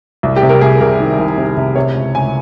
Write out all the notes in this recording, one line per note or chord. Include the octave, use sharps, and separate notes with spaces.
C2
G4
C3
A#4
C2 G#4
C2 A#4
D#3
C2
C3
C3
C3 C#5
C#2
C#2 G#5